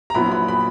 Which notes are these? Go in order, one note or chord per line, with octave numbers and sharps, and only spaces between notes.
A#5
A#1 A#2 F#3 B3 E4 B5
B5
B5